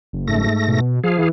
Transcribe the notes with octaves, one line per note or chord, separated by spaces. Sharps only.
F#1
G#2 A3 A#6
B2
F3 G#4 F5
E3